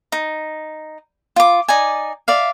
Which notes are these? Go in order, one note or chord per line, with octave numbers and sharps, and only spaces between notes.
D#4
F4 D6
D#4 D5 G#5
D5 E5 F5